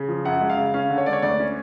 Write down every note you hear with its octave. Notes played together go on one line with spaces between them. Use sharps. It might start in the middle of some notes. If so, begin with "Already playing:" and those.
Already playing: C#3
F3
F#2 F#5
G#3
F5
C#3
C#4 F5
D3
C#5
G#3 D5
C#5
D2 D5
C#4